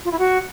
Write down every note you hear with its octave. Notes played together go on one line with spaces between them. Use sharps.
F4
E4
F#4